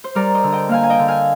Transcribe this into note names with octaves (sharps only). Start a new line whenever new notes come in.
C5
G3 A#4 D5
C5 D#5
D3
D#5 G5
A#3 F5 G#5
G#5
D#5 G5
D3
F5 G#5